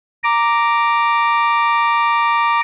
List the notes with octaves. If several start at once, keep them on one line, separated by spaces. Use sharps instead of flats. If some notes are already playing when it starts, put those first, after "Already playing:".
A#5 D6